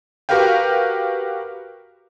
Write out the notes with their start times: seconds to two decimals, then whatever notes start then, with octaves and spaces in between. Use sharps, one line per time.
0.29 F#4 G4 A#4 B4 F5 G5